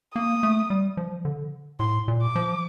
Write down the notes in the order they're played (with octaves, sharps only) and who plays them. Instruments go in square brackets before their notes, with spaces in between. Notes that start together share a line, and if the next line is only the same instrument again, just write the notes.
[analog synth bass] A#3 [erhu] D#6
[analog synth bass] A3
G3
F3
D3
[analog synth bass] A2 [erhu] C6
[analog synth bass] A#2
[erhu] D6
[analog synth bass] F3